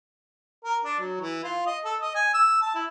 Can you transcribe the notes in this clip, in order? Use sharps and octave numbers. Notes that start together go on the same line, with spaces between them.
A#4
D4
F#3
E3
F4
D#5
A4
D#5
G#5
E6
A5
E4